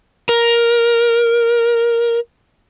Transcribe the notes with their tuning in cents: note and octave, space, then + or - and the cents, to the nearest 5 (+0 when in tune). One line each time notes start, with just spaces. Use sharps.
A#4 +10